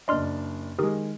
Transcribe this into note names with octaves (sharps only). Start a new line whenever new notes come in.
F#1 D4 D#5 C6 F6
D#3 G#3 G4 A#4 D#6